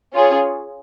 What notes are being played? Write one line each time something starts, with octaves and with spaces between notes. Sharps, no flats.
C#4 F4 G#4 C#5